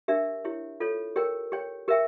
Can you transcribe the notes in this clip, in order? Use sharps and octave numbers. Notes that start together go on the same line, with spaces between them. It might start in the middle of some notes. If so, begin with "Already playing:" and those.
D4 G4 A#4 E5
E4 G4 C#5
F4 A4 C#5
G4 A#4 C#5 G5
G4 C#5 G5
G4 A#4 E5 G5